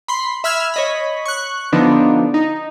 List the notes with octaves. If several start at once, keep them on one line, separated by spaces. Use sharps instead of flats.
B5 C6
E5 B5 E6 F6 G#6
C#5 D#5 B5
C#6 F#6
D3 F3 B3 D4 D#4
D#4